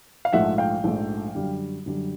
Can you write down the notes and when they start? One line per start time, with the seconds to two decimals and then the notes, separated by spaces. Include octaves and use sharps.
0.25 F5
0.33 A#1 G#2 F3 A3 E5 F#5
0.58 F5 G5
0.84 A#1 G#2 F3 A3
1.35 F#2 D3 G3
1.86 F#2 D3 G3